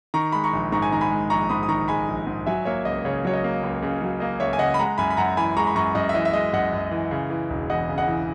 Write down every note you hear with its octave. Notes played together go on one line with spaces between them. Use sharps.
D#3 A#5 C#6
G#3 B5
A#5 C#6
A#1
G#2 A#5 C#6
G#5
D#3 A#5
G#5 B5
G#3
A#1 A#5 C#6
G#2 B5 D#6
D#6
D#3 A#5 C#6
G#3 G#5 B5
A#1
G#2
F#3 E5 G#5
A#3 C#5 E5
C#2 D#5
C#3 C#5
F#3 C#5
D#5
A#3
C#2
C#3
F#3
A#3 D#5
C#2 C#5 E5
G#5
C#3 D#5 F#5
B5
G#3 F#5 A#5
F#2 G#5 B5
B5
F#2 F#5 A#5
E3 G#5 B5
G#3 A#5 C#6
B5
F#2 A#5 C#6
F#2 D#5
E5
E3 D#5
E5
G#3 D#5
F#2 D#5 F#5
F#2
E3
C#3
E3
E1
E2 D#5 F#5
C#3
D#5 F#5
E3